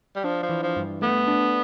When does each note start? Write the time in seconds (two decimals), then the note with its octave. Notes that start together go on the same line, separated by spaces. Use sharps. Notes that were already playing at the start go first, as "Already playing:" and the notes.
0.16 G3
0.24 F3 D4
0.43 F3
0.49 E3
0.63 F3
0.76 G2
1.02 A3 B3
1.27 D4